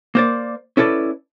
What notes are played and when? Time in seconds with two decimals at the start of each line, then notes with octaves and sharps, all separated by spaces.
0.15 A#3 C5 D5
0.77 C#4 E4 A4 B4 D5